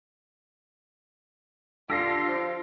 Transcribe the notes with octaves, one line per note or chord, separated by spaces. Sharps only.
D3 D4 F4 G4 E6 A#6 C7
F3